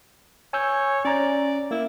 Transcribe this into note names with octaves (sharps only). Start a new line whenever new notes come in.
C#5 G#5 E6 G6
C#4 D5 A#5
A#3 E4